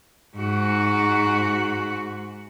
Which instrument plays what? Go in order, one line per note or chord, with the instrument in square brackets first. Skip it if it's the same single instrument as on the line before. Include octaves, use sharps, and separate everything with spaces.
[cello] G#2 F#4